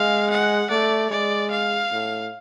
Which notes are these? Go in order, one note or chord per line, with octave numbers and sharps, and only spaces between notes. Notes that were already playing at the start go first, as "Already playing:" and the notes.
Already playing: G#3 F5
F#5
A3 D5
G#3 D5
F5
A2